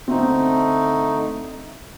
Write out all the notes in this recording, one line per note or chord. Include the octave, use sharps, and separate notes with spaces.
D3 A3 C4 D#4